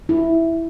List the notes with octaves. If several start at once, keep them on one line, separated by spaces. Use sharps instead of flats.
E4